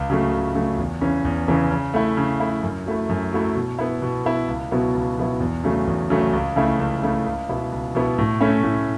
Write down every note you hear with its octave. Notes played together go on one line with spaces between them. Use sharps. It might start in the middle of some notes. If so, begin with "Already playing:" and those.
Already playing: C#2
C#3 F#3 A3
C#2
C#3 F#3 A3
E2
C#3 E3 C#4
E2
C#3 E3 C#4
C#3
A3 E4
C#3
A3 E4
F#2
F#3 A3 E4
F#2
F#3 A3 E4
B2
B3 E4
B2
B3 E4
C#2
B2 F#3 B3 E4
C#2
B2 F#3 B3 E4
E2
C#3 F#3 A3
E2
C#3 F#3 A3
C#2
C#3 A3 E4
C#2
C#3 A3 E4
C#2
B2 B3 E4
C#2
B2 B3 E4
A2
A3 C#4 E4
A2